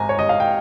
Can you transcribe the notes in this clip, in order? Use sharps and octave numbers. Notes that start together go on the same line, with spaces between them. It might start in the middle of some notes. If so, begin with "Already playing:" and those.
Already playing: G#1 G#5 A#5
C#5
G#1 D#5
F5
G5